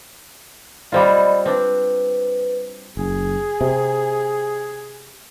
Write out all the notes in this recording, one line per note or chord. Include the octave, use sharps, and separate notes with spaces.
G3 C4 F4 D5 D#5 B5
C4 D4 B4
F#1 G#4
C3